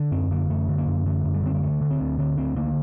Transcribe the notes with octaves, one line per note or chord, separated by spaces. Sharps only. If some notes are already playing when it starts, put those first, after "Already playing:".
Already playing: D3
F#2 C4
D3 A#3
F#2 A3
D3
A#3
F#2
D3 A3
F#2
G3
D3 C4
A#3
D2 A3
D3
C4
D2
D3 C4
D2 C4
D3 A#3